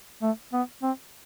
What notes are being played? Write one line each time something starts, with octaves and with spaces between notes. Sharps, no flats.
A3
B3
C4